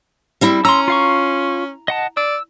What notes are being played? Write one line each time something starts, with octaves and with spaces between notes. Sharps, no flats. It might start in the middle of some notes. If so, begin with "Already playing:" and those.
G3 C4 E4
C#4 A#5 C6 E6
F4 F5 C#6
D#5 F#5 A5
D5 E6